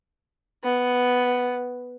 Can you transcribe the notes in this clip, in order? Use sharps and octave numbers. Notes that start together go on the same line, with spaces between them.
B3